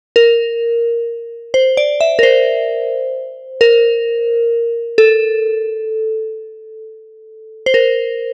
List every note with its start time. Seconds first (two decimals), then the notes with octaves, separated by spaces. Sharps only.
0.16 A#4
1.54 C5
1.77 D5
2.01 E5
2.19 A#4
2.23 C5
3.61 A#4
4.98 A4
7.66 C5
7.74 A#4